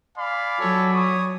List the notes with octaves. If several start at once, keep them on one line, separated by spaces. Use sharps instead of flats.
D5 F5 G#5 B5
F#3 A4 C#5
C#5 D#6